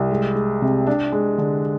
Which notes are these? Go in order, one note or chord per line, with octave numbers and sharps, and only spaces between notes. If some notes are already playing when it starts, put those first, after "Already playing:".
Already playing: C2
G#3
G#3
C3
D4
G#3
D3